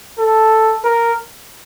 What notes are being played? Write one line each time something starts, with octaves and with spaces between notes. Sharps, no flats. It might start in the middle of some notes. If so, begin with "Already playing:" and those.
A4
A#4